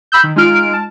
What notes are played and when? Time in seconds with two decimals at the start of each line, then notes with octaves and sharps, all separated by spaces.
0.12 B5 E6 G6
0.23 D#3
0.36 G#3 D#4 F4 F6 D7
0.73 A5